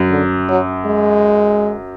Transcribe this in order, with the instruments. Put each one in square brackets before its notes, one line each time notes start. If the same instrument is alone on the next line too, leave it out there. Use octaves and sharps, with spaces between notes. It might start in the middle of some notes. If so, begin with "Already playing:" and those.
Already playing: [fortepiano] F#2
[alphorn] D3
F#3
G#3